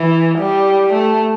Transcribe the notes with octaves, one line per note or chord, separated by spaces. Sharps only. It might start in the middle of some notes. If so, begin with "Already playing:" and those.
Already playing: E3
G3
A3